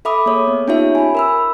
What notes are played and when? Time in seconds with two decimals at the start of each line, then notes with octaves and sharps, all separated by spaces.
0.05 A4 E5 B5 D6 D#6
0.26 A#3 G#4 C#5
0.47 B3
0.68 C#4 D#4 F4 G4 C#5 E5
0.95 G#5 B5
1.15 A#4 B5 E6